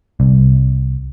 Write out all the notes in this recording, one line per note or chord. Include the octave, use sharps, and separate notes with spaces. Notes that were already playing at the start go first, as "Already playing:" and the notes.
C2